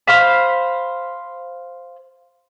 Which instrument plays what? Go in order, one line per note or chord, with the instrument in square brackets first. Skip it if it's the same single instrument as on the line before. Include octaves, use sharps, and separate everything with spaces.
[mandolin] C5 F5 B5